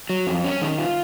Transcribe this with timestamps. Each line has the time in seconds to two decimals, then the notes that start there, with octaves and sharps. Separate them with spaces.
0.10 F#3
0.27 F2
0.44 C#4
0.61 D#3
0.78 F4